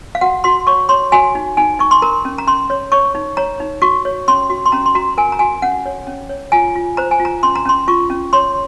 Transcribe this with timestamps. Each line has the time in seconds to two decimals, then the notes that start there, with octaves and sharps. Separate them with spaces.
0.15 F5
0.21 F#4 F#5
0.44 F#4 C6
0.67 C#5 C#6
0.89 C#5 C6
1.12 F#4 G#5
1.35 D#4
1.57 D#4 G#5
1.79 D#4 C#6
1.91 C6
2.02 A#4 A#5
2.25 C#4
2.38 A#5
2.47 C#4 C6
2.70 C#5
2.92 C#5 C#6
3.15 D#4
3.37 C#5 A#5
3.60 D#4
3.82 F#4 C#6
4.05 C#5
4.28 C#4 C6
4.50 F#4
4.66 C6
4.72 C#4 A#5
4.86 C6
4.95 F#4 A#5
5.17 A#4 G#5
5.32 A#5
5.39 F#4 G#5
5.62 C#4 F#5
5.86 C#5
6.07 C#4
6.29 C#5
6.52 F4 G#5
6.76 F4
6.97 C5 A#5
7.11 G#5
7.20 F4
7.25 A#5
7.43 C#4 C6
7.56 A#5
7.65 C#4 C6
7.87 F4 C#6
8.10 C#4
8.33 C#5 C6